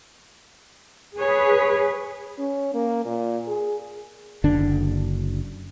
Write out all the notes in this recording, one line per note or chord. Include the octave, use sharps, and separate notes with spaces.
G#4 B4 C#5
C#4
A#3
A#2
G#4
F#1 D3 D4